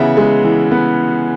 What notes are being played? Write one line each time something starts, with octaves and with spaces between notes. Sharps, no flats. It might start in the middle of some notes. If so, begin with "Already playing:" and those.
Already playing: C#3 E3 B3 E5 F#5
G#3
E3
B3